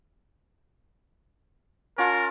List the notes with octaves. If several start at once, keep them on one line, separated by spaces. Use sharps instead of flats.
C#4 F4 A#4 A5